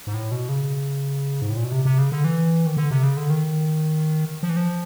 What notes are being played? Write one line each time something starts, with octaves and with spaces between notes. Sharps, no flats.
G#2
A2
B2
C#3
G#2
A2
A#2
B2
C3
C3
C#3
D3
E3
D#3
D3
C3
C#3
D3
D#3
F3
E3
F3